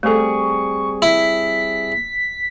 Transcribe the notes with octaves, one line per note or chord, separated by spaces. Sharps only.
G3 A3 C4 G#4 A4 C#6
E4 B6